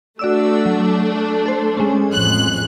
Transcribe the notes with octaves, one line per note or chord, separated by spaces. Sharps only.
A3 D4 F#4 D5 E6
F#3
A4 C5
G#3 C#4
A1 F2 F#6